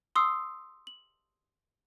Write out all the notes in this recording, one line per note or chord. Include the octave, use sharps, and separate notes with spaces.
C6 D#6 E6 C7
F#7